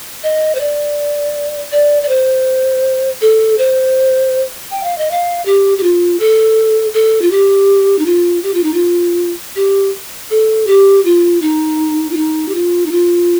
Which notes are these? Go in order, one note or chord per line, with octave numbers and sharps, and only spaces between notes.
D#5
C5
D5
D5
D5
C5
A4
C5
G5
F5
D#5
F5
G4
G4
F4
A4
A4
F4
G4
D#4
F4
G4
F4
D#4
F4
G4
A4
G4
F4
D#4
F4
D#4
G4
F4
D#4
F4